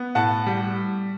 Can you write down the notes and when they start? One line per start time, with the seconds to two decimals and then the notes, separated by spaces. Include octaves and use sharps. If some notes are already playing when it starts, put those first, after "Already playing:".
Already playing: B3
0.15 A2 F#5 A5
0.47 G3